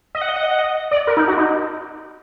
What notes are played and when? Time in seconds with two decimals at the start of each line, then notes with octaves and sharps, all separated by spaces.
0.15 D#5
0.21 F#5
0.29 D#5
0.36 F#5
0.43 D#5
0.51 F#5
0.59 D#5
0.91 D5
1.07 A#4
1.17 D#4
1.28 F#4
1.38 D#4